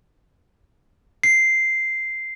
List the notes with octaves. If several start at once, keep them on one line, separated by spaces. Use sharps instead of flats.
C7